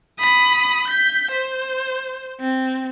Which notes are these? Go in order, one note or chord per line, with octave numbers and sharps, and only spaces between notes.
B5 D#6
G6 B6
C5
C4